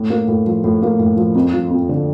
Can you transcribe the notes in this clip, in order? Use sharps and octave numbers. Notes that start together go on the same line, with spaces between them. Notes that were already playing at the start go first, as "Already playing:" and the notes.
Already playing: A2
A#3
A2
F3
A2
A#3
A2
F3
F2
F3
F2
D3